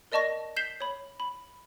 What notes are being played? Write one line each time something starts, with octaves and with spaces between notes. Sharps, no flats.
A#4 D5 D#5 A5 C#6 A#6
G6 B6 C7 E7 G7
C#5 B5
B5